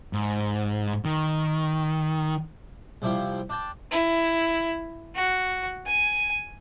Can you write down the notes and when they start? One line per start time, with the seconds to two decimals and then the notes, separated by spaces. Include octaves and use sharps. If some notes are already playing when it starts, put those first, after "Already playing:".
0.13 G#2
1.05 D#3
3.02 C2 F3 G3 E4 G5 C6
3.49 D4 G5 A5
3.91 E4
5.15 F#4
5.86 G#5